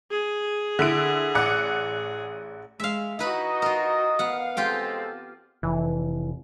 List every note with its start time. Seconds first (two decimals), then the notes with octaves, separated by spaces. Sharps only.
0.11 G#4
0.79 D3 E4 D7
1.35 A1 D5 F#5
2.80 G#3 E5 F5
3.19 D#4 E4 F#4 B4 D#5 B5
3.62 F4 A#4
4.19 B3 F5 F#5
4.57 G#3 C4 F4 G4 A4 G5
5.63 F1 E3